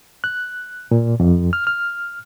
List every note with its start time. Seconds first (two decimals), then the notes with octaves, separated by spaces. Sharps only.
0.24 F#6
0.91 A#2
1.20 F2
1.53 F6
1.67 F6